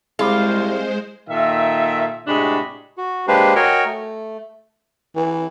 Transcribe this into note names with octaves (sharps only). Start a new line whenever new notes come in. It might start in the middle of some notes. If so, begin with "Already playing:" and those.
C2 G#3 F4 G#4 C5 B5 D6
A#2 D#3 A4 E5
A2 C3 G#3 D4 F#4 B5
F#4
G#3 A#3 D4 G4 B4 C5
F#4 A#4 C#5 D#5 G5 G#5
A3
E3